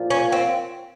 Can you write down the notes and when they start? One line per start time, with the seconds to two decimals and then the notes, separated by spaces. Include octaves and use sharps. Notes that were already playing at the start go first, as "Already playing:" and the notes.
Already playing: A#2 F3
0.10 C#4
0.32 C4